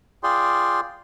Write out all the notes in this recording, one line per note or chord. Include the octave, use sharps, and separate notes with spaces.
F4 G#4 D5 G5 C6